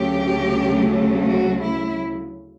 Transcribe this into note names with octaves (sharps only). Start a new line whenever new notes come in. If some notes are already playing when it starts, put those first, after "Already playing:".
Already playing: D2 C#3 F#3 A3 G4
F#4
E4